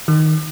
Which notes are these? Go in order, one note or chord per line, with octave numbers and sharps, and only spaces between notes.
D#3